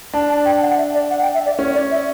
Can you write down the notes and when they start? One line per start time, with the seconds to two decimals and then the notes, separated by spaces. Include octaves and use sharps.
0.14 D4 A5
0.29 A5
0.45 G5
0.62 F#5
0.78 E5
0.94 D5
1.10 F#5
1.22 G5
1.34 E5
1.46 D5
1.59 C#4 C#5
1.75 D5
1.91 E5